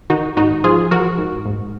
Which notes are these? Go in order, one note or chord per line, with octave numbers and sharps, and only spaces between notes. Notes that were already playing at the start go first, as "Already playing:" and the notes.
D#3 D#4 F#4
G#2 D#4 F#4
F3 F4 G#4
F3 F#4 A#4
G#2
G#2